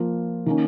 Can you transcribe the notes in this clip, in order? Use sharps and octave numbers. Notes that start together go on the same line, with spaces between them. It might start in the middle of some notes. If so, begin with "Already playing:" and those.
Already playing: F3 A#3 F4
D#3 A#3 C#4